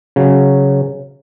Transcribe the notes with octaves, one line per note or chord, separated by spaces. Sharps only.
C#3 F#3